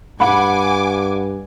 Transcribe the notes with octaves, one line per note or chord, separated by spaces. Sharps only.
G2 F#5 G#5 B5 D6